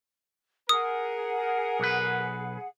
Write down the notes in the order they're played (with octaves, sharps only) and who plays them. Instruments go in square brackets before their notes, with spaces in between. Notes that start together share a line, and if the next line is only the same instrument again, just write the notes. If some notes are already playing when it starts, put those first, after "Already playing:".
[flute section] G#4 F#5 [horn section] A#4 [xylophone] D#6
[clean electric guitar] B1 B4